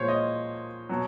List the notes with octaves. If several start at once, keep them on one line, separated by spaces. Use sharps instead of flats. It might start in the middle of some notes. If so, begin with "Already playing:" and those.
Already playing: A#2 F3 G#3 C5 C#5
D#5
B2 F#3